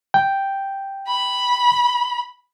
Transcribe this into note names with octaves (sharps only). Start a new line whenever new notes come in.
G5
B5